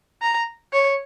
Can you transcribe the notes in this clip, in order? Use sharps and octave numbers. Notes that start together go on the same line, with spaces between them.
A#5
C#5